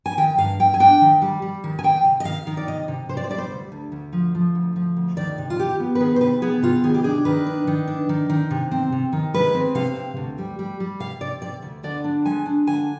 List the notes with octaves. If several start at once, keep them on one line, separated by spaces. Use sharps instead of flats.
G#5
D#3 G5
G2 F5
G2 G5
G#5
D4 G5
D#3
G3
G3
D#3
G#5
D#3 G5
C3
D#5
D#3 F5
D#3
D5
C3 D#5
C3
C3 C5
D5
C5
G3 D5
C5
D2
D2
D2
F3
F3
D2
F3
D2
D#3 D5
C3
F4
C3 G4
B3
B4
D#3 G#4
C5
C3 B4
B3 G#4
C3 F4
D#3 G#4
G4
D4 G#4
D#3 B4
D4
D#3
D4
D#3
D#3
C3
C4
C3
D#3
G#3 B4
C4
C3 F5
C4
D2
G3
G3
G3
C3 F5
C3 D5
C3 D5
D2
D3 D5
D4
G#3 G#5
D4
D3 G#5